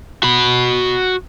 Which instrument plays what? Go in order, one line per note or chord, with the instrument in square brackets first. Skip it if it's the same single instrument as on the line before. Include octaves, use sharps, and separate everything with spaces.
[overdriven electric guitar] F#4 B5